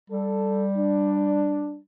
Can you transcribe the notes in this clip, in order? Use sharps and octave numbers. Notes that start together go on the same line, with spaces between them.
G3 A4
D4